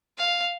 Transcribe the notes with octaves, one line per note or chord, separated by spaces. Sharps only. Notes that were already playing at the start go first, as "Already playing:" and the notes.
F5